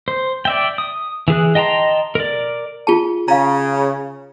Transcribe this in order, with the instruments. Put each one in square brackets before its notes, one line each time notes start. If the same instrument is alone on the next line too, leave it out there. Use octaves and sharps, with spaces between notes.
[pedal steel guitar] C5
D5 E5 G5
D#6
E3 G#4 F#6
D#5 G5 A5 A#5 C6
A#4 D5
[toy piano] F4 G#4 A5
[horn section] C#3 [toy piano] F5 A#5